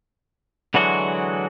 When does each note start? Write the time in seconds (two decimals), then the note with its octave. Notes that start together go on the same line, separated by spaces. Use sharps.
0.74 D3 E3 F#3 G#3 F#4